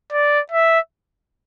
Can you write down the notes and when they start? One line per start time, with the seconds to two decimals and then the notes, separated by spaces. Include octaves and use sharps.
0.13 D5
0.51 E5